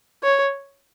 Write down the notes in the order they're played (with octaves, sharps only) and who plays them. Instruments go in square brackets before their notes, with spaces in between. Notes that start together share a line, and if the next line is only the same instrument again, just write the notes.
[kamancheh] C#5